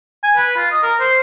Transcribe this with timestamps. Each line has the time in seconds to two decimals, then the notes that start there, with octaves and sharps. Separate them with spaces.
0.24 G#5
0.37 B4
0.57 F4
0.71 D#5
0.83 A#4
1.00 C5